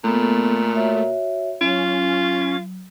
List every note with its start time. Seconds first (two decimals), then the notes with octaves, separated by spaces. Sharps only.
0.04 A#2 A3 B3 A4
0.75 F#4 C#5 E5
1.61 F#3 C#4 F4